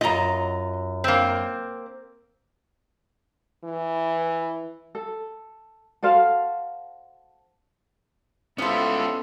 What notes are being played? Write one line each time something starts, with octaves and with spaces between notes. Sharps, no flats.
F#2 F4 D#5 A#5
A#3 C4
E3
A4
F#4 A4 C5 F5
B3 C#4 E4 F4 A4 C5